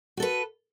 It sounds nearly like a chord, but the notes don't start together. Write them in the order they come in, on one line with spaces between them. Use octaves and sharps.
F#4 A4 B4